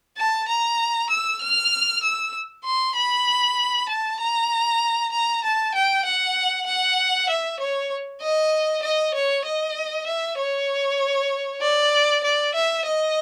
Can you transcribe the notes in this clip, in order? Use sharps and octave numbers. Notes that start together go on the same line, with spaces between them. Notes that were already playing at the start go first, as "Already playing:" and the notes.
A5
A#5
E6
F6
E6
C6
B5
A5
A#5
A#5
A5
G5
F#5
F#5
E5
C#5
D#5
D#5
C#5
D#5
E5
C#5
D5
D5
E5
D#5